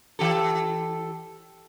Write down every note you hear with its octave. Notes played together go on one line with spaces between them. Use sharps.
E3 G4 A4